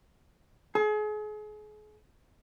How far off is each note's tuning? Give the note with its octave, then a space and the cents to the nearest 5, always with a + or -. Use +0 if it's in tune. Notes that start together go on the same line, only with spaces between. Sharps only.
G#4 +35